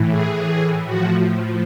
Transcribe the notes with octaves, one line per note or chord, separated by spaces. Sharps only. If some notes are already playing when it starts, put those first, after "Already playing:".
Already playing: A2 E3
G#4
A2 F3 F#4